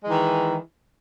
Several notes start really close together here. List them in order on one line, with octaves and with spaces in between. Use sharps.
G#3 E3 D#3